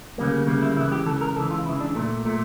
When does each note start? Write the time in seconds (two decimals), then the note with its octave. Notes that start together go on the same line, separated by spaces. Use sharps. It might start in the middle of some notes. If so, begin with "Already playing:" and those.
0.18 D2 C#3 G3 A#3
0.47 D2 C#3 G3 A#3
0.62 E4
0.76 C#2 C#3 E3 E4
0.92 G4
1.06 C#2 C#3 E3 A4
1.21 A#4
1.36 C#2 C#3 E3 A4
1.51 F4
1.66 C#2 C#3 E3 E4
1.80 D4
1.95 A#2 A3
2.25 A#2 A3